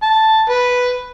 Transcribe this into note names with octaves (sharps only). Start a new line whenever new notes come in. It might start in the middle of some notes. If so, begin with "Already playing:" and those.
A5
B4